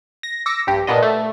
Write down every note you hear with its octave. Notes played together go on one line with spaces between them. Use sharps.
A#6
D6 E6 A#6 C#7
A#1 G2 G4
A#2 B3 D4 D#5
A3